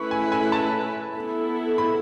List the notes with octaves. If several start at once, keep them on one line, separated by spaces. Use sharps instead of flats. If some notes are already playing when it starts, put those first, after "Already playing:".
Already playing: A3 C#4 E4 B4 C#6
G#5
G#5
A5
B3 E4 A4
B5